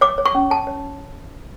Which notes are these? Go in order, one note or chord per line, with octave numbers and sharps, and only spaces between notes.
C#5 D6
C#5
C#6
C#4
C#5 A5
C#5